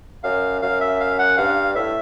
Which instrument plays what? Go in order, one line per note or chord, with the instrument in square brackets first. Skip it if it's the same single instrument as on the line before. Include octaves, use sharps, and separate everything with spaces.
[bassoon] F#2 [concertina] F5
[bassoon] F#2 [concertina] F5
[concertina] E5
F5
F#5
[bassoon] G2 [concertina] F5
[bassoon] A2 [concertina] E5